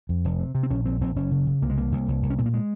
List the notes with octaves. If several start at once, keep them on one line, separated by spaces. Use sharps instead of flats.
F2
F1
C3
C3
C4
A#1 C#4
A#1 C4
A#1 C4
F#1 C#4
C#3
C#3
C2 A#3
G#3
C2 A#3
C2
C2
C2
C#4
A#2 C4
A#3
G#3